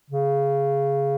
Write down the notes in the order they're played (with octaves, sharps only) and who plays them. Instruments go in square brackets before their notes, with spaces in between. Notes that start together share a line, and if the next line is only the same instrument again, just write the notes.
[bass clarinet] C#3